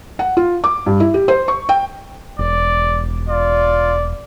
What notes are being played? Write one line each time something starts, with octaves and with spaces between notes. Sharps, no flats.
F#5
F4
D6
G2
E4
G4
C5
C#6
G5
E1 D5
F4 D5